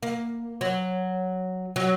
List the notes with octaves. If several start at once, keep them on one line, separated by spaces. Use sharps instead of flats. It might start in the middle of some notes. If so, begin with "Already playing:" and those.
A#3
F#3
F#3